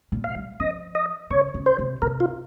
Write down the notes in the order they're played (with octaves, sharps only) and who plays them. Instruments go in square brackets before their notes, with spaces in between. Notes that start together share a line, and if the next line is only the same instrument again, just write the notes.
[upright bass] A#2
[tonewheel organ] F5
[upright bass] G3
[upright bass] F3 [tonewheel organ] D#5
[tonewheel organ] D#5
[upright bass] C#3 [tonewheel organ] C#5
[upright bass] C#3
[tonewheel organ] C5
[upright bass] C3
[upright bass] C3 [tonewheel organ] A#4
[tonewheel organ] F4